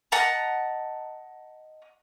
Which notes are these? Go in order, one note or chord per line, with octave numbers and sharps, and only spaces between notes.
D#5 F#5 A5 A#5